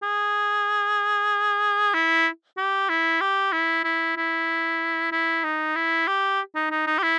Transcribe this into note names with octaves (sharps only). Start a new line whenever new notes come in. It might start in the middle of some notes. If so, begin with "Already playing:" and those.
G#4
E4
G4
E4
G4
E4
E4
E4
E4
D#4
E4
G4
D#4
D#4
D#4
G4
E4